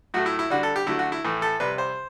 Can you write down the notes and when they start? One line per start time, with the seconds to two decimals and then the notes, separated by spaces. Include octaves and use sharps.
0.14 A2 F#3 A3 F#4
0.26 E4
0.39 E4
0.50 D3 G3 F#4
0.63 A4
0.76 G4
0.87 D3 F#3 A3 E4
0.99 F#4
1.12 E4
1.25 A2 E3 A3
1.42 A4
1.60 C3 G3 B4
1.78 C5